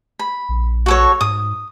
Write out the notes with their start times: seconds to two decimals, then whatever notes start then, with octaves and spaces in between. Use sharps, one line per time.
0.19 B5
0.49 A#1
0.86 F#4 A4 C#5
1.21 G#2 D#6